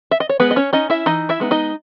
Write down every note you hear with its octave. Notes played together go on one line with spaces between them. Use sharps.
E5
D#5
C#5
G#3 B3 B4
D#5
C#4 C#5
C#4 D#4 D#5
E4 E5
E3 D#4 D#5
E4 E5
G#3 B3 D#4
D#4 D#5